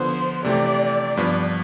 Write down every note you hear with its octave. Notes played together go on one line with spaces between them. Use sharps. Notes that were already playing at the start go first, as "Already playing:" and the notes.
Already playing: D3 F3 B3 C5
C3 E3 A3 C4 G4 D5
G2 F3 B3